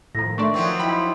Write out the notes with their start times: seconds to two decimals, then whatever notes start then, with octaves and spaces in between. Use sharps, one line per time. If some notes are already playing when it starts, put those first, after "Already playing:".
0.15 A2 D#3 F3 A#5 A#6
0.38 A3 D4 D5 E5 C6 C#6
0.54 F3 F#3 C4
0.80 D#4 E4 G5 B5